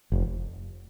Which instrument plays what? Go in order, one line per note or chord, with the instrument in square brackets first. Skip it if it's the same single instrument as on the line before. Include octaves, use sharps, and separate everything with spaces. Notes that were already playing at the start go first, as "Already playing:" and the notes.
[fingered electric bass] F1